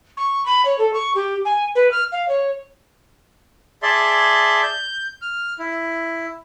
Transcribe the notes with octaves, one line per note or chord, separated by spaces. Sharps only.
C#6
B5
C#5
A4
C#6
G4
G#5
B4
F6
F5
C#5
G#4 D5 E5 A5 C6
G6
F6
E4